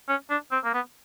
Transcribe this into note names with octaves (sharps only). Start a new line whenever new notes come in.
C#4
D4
C4
A#3
B3